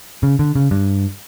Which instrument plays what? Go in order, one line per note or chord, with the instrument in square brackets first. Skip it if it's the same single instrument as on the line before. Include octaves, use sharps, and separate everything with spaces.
[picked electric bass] C#3
D3
C#3
G2